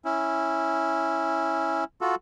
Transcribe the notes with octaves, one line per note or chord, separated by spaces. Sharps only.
C#4 E4
F4 F#4 A4